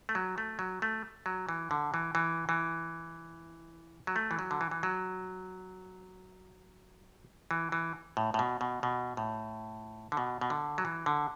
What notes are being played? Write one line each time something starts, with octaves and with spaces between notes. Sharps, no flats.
A3
F#3
A3
F#3
A3
F#3
E3
D3
E3
E3
E3
F#3
A3
E3
F#3
D3
E3
E3
F#3
E3
E3
A2
A2
B2
B2
B2
A2
D3
B2
B2
D3
F#3
E3
D3